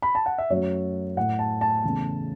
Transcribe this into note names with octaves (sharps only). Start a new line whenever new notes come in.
B5
A5
F#5
E5
F#2 F#3 A3 C#5
A2 A3 F#5
A5
A5
E2 C#3 E3 A3